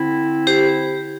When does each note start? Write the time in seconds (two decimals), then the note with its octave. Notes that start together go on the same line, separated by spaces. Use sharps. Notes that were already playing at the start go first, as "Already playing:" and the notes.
Already playing: D3 C4 E4
0.47 G4 C5